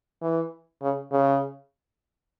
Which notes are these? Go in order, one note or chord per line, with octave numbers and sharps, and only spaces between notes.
E3
C#3
C#3